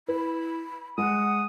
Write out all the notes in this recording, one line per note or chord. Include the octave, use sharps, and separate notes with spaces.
E4 B4 B5
G#3 F#5 D#6